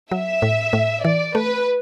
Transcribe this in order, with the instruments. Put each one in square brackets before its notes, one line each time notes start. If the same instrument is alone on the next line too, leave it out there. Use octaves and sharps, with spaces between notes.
[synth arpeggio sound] F#3 [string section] E5
[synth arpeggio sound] A2
A2
[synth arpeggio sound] E3 [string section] D5
[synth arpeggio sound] A3 [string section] B4